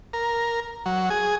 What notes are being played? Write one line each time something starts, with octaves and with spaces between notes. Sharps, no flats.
A#4
F#3
G#4